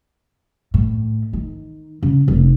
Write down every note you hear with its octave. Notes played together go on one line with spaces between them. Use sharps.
A2
D#3
C#3
F1